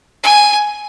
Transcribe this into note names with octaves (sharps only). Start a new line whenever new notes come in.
G#5